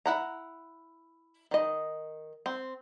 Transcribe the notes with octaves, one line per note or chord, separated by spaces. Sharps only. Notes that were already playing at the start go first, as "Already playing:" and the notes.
E4 F#5 A#5
D#3 D#5
C4